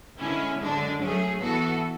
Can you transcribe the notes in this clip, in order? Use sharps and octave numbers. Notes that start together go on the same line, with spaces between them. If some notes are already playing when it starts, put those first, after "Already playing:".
D3 G#3 C#4 E4
F#2 D3 G#3 D4
F#3 A3 C#4 G#4
E3 B3 F#4 A4